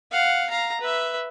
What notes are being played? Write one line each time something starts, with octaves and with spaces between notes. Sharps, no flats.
F5 F#5
F5 A#5
B4 E5